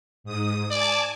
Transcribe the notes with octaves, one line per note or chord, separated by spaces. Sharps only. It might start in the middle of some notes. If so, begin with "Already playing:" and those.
G#2 D#6
D5 G#5 A5 D6